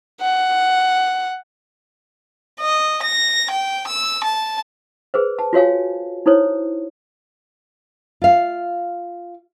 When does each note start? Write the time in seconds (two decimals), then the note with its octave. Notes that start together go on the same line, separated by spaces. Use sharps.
0.21 F#5
2.60 D#5
3.03 A#6
3.50 G5
3.87 E6
4.24 A5
5.14 G#4 B4 C5
5.39 A5
5.53 F4 F#4 C#5 F5 G#5
6.26 D#4 E4 A4 C5 C#5
8.22 F4 F5